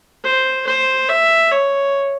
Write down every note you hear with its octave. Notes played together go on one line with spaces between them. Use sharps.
C5
C5
E5
C#5